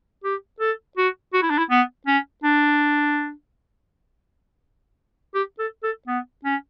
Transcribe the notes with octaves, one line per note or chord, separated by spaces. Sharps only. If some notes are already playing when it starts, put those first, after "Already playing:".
G4
A4
F#4
F#4
E4
D4
E4
B3
C#4
D4
G4
A4
A4
B3
C#4